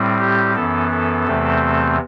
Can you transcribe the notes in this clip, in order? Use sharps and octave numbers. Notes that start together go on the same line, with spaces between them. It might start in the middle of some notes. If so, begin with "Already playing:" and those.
Already playing: A2 G3 C4
G4
F#2 E3 B3 A4
A4
E2 C3 E3 A3 C4